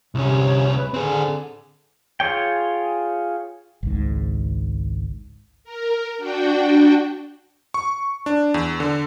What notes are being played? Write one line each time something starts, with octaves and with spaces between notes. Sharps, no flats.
C2 C3 C#4
B4
D3 C4 G#4
F4 G#4 C#5 G5
G#1 C#2 G#2
A#4
D4 F#4 G5
C#6
D4
E2
D3